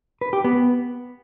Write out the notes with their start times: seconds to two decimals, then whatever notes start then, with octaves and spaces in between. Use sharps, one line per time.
0.21 B4
0.33 G4
0.44 B3